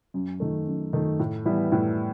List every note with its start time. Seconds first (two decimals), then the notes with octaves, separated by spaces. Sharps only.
0.14 F#2
0.40 D#3 A3
0.67 F#2
0.93 D#3 A3
1.20 A2
1.45 E3 G3 B3 E4
1.72 A2